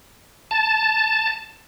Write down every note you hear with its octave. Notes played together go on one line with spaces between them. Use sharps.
A5